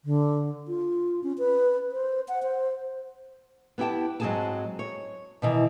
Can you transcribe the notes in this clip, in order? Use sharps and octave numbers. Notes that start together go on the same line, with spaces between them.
D3
F4
C#4
B4
C5
F#5
C5
B3 E4 G4 G5 A5
G#2 F#3 C4 G#4 G#5 A5
C#5
B2 D#3 E3